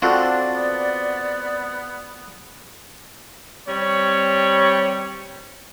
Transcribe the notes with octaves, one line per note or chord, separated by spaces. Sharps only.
C4 D4 F4 F#4 A4 D5
B3
G3 C4 C#5